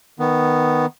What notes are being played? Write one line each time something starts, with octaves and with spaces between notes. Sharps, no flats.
D#3 B3